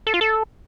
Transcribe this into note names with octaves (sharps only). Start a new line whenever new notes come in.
A4
F4
A4